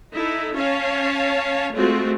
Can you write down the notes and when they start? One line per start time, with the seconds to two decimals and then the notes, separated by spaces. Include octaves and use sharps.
0.14 D#4 E4 A4
0.54 C#4 C#5 F5 A5
1.73 G#3 A3 C4 F4 F#4